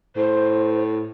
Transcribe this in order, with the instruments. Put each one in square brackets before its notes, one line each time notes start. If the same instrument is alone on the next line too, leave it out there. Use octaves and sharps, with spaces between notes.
[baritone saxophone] A2 [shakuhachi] C5